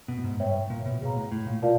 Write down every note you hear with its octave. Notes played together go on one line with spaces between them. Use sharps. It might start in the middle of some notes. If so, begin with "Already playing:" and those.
B2
A2
G#2
G2 C#5 E5 G5
A#2
B2
B2 G#4 C#5 F5 A#5
A2
A2
A#2
B2 F4 A#4 D5 F5 A5